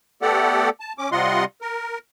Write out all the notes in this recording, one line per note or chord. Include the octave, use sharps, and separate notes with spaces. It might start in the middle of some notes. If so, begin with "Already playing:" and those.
A3 B3 G4 A4 D5 F#5
A5
C#4 D6
C3 G3 F4 D#5 F#5 C6
A#4